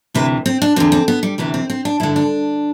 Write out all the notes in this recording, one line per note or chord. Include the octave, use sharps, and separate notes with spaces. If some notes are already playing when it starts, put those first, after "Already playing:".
D2 C3 E3 B4
C4
D4
E2 D3 C4
C4
B3
G3
D2 C3 E3 B3
C4
C4
D4
G2 D3 E4
D4